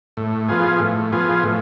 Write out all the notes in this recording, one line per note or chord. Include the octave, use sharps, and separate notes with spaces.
A2
F3 B3 F4 G#4
A2
F3 B3 F4 G#4
A2